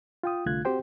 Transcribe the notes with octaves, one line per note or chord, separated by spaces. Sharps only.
F4 G5 D#6
C2 D3 A3 F4 F#6 G#6
C4 F#4 G4 C5 G5